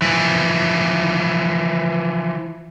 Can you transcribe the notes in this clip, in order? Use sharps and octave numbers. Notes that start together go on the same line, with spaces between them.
E3 F3